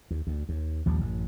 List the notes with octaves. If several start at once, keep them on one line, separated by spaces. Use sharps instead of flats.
D#2
D2
D#2
A#1 D#2 F3 G3
A1 F#2